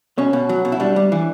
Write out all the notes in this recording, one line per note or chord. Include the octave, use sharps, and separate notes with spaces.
B2 C#4
B2
F#3
B2
E4
G3 D4
G3
E3